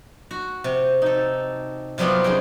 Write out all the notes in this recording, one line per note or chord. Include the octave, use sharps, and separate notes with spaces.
F#4
C3
D#4 A4
C3 F#3 G3 B3 F4
F#2 D#4 G#4 C5 G5